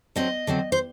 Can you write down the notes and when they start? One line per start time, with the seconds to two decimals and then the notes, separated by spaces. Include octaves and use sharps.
0.16 D3 F#3 C4 D#5
0.47 D3 F#3 C4
0.72 C5